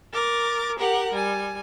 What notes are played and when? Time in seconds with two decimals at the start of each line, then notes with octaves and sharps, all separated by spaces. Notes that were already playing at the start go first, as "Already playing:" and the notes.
0.13 A#4 D6 A6
0.77 G4 A#4 F#5
1.12 G3 G#5